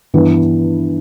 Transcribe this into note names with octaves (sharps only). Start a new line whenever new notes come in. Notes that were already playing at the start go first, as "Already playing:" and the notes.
G2 E3 B3 E4